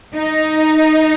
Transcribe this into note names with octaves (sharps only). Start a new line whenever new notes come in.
D#4